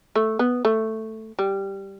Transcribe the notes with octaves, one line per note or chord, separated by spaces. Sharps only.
A3
B3
A3
G3